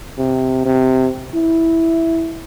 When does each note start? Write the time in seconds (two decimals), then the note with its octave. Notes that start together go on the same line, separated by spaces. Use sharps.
0.18 C3
0.65 C3
1.34 E4